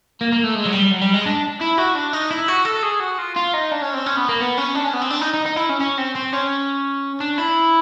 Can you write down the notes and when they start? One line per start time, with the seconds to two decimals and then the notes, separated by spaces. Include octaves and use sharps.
0.21 A#3
0.32 A#3
0.44 A3
0.55 G#3
0.66 F#3
0.72 G3
0.91 F#3
1.02 G3
1.14 G#3
1.26 D4
1.61 E4
1.78 F#4
1.95 D4
2.13 D#4
2.31 E4
2.48 F#4
2.65 A4
2.83 G#4
3.00 F#4
3.18 F4
3.36 F4
3.53 D#4
3.71 D4
3.82 C#4
3.94 C4
4.06 C#4
4.17 B3
4.29 A#3
4.40 B3
4.57 C#4
4.75 D4
4.84 C#4
4.93 B3
5.02 C4
5.11 D4
5.22 D#4
5.34 D#4
5.46 D#4
5.57 E4
5.69 C#4
5.81 C#4
5.98 C4
6.16 C4
6.33 C#4
7.21 D4
7.38 E4